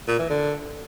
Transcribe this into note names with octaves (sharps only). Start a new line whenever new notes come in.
A#2
E3
D3